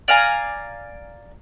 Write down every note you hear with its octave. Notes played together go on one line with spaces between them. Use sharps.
D5 F5 G#5 A#5